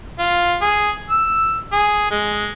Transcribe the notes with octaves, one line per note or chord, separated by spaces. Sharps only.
F4
G#4
E6
G#4
G#3